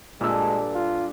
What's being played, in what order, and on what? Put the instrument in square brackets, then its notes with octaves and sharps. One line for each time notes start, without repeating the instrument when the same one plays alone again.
[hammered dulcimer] G2 A4 [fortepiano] A#2 E6 [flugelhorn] G#3
[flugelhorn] F4